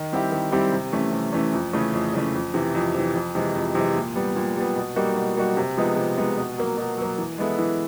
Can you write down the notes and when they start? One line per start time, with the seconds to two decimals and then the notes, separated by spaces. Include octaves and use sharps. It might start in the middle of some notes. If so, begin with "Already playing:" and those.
Already playing: D#3
0.12 G3 C4 E4 G4
0.32 D#3
0.52 G3 C4 E4 G4
0.73 C3
0.93 E3 A3 C#4
1.12 C3
1.33 E3 A3 C#4
1.53 F2
1.73 C#3 E3 A3 C#4
1.93 F2
2.14 C#3 E3 A3 C#4
2.34 F2
2.54 C3 E3
2.75 F2
2.94 C3 E3
3.14 F2
3.35 C3 E3 G#3
3.56 F2
3.75 C3 E3 G#3
3.96 A#2
4.16 G3 B3
4.36 A#2
4.56 G3 B3
4.76 B2
4.96 G3 A#3 D#4 F#4
5.16 B2
5.37 G3 A#3 D#4 F#4
5.57 C3
5.77 F3 G#3 B3 D#4
5.97 C3
6.18 F3 G#3 B3 D#4
6.37 B2
6.58 F#3 A#3
6.77 B2
6.98 F#3 A#3
7.18 E3
7.38 G#3 B3 E4 A4
7.59 E3